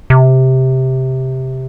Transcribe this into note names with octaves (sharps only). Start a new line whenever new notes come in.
C3